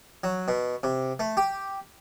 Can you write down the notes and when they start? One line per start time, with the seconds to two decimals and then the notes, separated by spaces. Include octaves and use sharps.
0.24 F#3
0.48 B2
0.83 C3
1.20 A3
1.37 G4